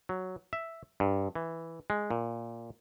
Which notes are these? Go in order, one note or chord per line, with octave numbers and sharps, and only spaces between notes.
F#3
E5
G2
E3
G#3
A#2